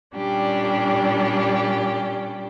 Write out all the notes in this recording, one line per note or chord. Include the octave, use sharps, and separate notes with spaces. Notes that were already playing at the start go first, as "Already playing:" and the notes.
A#2 G3 C#4 D4 G4